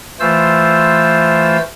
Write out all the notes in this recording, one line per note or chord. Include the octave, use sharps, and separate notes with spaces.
E3 A3 F4 C5 E6